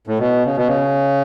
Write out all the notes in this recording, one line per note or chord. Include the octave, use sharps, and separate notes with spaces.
A2
B2
C#3
B2
C#3